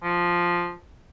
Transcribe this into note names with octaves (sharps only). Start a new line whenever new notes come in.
F3